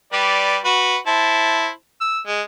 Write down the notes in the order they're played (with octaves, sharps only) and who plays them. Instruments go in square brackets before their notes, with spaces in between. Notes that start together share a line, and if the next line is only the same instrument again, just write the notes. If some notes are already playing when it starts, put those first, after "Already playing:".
[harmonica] G3 B4 D5
F#4 B4
E4 C5 A5
E6
G#3